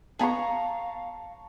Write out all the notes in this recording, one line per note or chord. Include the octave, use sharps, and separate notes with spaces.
B3 G#4 F5 A5 A#5 C#6